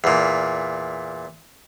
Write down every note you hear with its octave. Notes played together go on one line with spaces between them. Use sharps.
E2 A#2